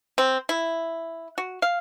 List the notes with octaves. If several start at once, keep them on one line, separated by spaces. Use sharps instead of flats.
C4
E4
F#4
F5